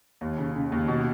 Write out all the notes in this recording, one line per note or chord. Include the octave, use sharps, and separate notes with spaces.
D#2
C#3
C#3
D#2
B2